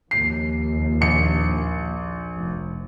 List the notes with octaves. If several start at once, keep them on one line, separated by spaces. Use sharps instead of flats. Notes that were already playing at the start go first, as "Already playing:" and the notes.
D#2 F3 C7
A#1 C#7
F1